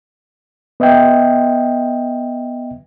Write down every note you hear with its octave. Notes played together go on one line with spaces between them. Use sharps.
B3 D#5 E5 G5